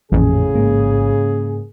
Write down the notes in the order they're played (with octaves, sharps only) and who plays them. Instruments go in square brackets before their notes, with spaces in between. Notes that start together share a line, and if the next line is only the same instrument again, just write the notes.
[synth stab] A1 [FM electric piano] F2 A#2 [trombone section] C#3 G#4
[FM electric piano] G#2 A#3